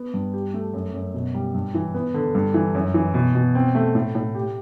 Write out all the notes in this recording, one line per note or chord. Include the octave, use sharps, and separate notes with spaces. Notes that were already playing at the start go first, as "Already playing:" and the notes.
Already playing: B3
G2
G4
A3
F#2
F#2
B2
G3
G2
E3
B3
D3
G2
E3
F#2
E3
B2
B2
C4
A3
A2
A2
G4